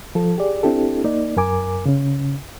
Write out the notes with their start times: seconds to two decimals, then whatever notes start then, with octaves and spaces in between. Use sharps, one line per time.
0.15 F3 A4
0.38 G4 G#4 D5
0.63 C4 D4 E4 G4 A4
1.04 A#3 D#4 D5
1.37 F#2 A#4 G#5 D6
1.86 C#3 C#4